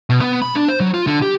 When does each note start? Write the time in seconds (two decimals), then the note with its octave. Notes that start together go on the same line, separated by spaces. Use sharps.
0.10 B2
0.21 B3
0.42 B5
0.56 D4
0.68 C5
0.80 F#3
0.94 F4
1.07 D3
1.22 G4